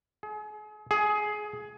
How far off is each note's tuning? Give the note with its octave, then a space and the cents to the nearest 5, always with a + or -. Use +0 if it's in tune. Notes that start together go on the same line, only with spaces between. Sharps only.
G#4 +35
G#4 +15